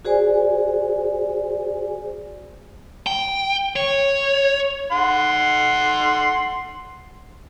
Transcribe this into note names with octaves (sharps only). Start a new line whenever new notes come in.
F#4 G#4 C5 D5 G#5
G5
C#5
F#5 C6